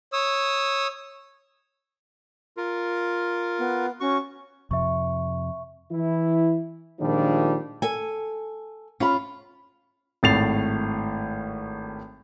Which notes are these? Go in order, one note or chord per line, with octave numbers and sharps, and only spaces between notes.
C#5 D#6 E6
F4 A#4
B3
C#4 F#4 C#6
F2 C3 E5 C#6
E3 E4
A#2 D#3 F3 G3 G#3 D4
A4 G#5
C#4 F4 B5
G#1 A2 A6 C7 F7